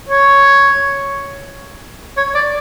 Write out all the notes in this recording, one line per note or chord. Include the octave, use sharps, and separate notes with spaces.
C#5
C#5
D5